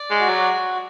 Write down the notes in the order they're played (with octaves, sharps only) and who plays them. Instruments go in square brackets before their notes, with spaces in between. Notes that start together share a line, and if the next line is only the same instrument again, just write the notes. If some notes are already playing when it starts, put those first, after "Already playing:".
Already playing: [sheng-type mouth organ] D5
[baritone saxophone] G#3
[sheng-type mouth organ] F#4
[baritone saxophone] F#3